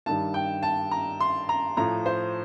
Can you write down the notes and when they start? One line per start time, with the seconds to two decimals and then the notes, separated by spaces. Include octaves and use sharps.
0.06 G2 D#3 G3 A5
0.34 G5
0.63 A5
0.91 A#5
1.21 C6
1.49 A#5
1.77 A2 F3 A#5
2.06 C5